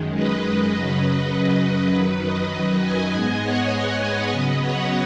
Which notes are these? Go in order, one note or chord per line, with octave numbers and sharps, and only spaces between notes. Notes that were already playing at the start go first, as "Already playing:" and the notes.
Already playing: F#2 D#3 G#3
B4 D#5
F#2 C#3 F#3
B4
F#2 D#3 F#3 B4
B4 D#5
D#5 G#5
G#2 G#3 B3
C#5 F#5
B4
C#3 F#3 B3 B4 D#5
C#5 F#5